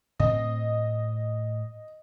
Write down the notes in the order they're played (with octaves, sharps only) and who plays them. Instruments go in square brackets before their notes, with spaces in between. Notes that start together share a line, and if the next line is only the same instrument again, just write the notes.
[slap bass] A2 C4 [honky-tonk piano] D#5